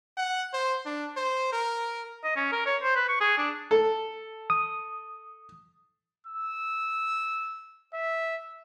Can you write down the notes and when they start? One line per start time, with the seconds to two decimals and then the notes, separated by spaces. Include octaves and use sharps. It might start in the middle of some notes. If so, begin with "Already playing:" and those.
0.17 F#5
0.53 C5
0.86 D4
1.17 C5
1.52 A#4
2.24 D#5
2.36 C#4
2.52 A#4
2.66 C#5
2.83 C5
2.96 B4
3.09 C#6
3.20 G#4
3.38 D4
3.71 A4
4.50 D#6
6.27 E6
7.94 E5